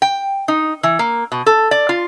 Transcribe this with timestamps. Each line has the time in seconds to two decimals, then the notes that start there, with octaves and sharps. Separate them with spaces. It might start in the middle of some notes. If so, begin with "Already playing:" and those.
0.02 G5
0.48 D#4
0.83 E3
0.99 A#3
1.32 B2
1.46 A4
1.71 D5
1.89 F4